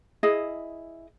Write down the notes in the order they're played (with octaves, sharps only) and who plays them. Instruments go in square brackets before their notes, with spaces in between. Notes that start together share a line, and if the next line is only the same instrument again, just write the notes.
[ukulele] E4 G#4 D#5